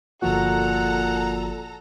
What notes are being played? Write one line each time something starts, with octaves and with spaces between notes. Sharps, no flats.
G1 A#2 F3 F#4 A4 F#5 A#5